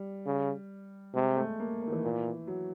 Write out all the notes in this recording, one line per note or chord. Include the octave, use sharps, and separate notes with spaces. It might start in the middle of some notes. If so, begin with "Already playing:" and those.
Already playing: G3
C#3
C3 G#3
A3
A#3
A#3
D#3
E3
A#2
F#3